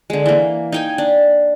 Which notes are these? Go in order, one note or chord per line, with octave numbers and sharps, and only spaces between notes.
D3 G#3
E3 A#3
D#4 G5 G#5
D4